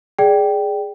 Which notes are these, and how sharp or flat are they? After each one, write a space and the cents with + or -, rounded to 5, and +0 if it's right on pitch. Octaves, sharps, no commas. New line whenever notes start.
G#4 +0 D5 +0 G5 -5